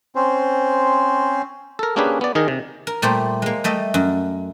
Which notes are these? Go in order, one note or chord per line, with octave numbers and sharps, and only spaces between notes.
C4 C#4 C5
A4 A#4
A#3 C#4 D4 G4 G#4 B4
B3 D5
D#3 D#4 G#4 A#4
C3
A#4
A#2 G3 A3 G4 C5
G#3 A#3
G3 A3 D#5 E5
F#2